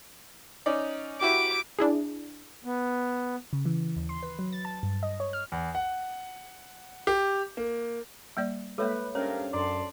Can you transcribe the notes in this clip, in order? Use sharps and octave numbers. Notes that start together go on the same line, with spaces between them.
C#4 D#4 D5
E4 F#4 G4 D6
D4 E4 G#4
B3
C#3
E3
D#2
C6
B4
F#3
A6
A5
G2
D#5
C#5
F6
E2
F#5
G4
A#3
G3 A#3 D5
G#3 A#3 A4 B4 C#5 E5
G2 C#4 A#4 C5 C#5 F5
F#2 D4 A4 D5 C6